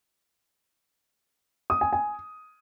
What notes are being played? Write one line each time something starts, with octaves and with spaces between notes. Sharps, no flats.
D#6
G#5
G#5